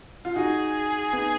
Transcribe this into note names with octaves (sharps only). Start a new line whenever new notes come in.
F4
D#4 F#4 G#4
B3 D#4